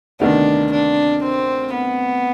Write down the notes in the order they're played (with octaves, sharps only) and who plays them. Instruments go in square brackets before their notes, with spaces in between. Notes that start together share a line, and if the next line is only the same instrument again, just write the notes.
[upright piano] D2 C3 D#3 B3 [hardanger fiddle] D4
[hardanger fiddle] D4
C4
B3